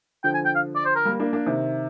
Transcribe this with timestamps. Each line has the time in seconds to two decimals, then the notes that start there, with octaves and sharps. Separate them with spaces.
0.24 D3 F3 G5
0.34 G#5
0.45 G5
0.55 F5
0.76 D5
0.85 C5
0.96 A#4
1.05 G3 A#3
1.20 A#3 D4
1.33 A#3 D4
1.46 C3 D#3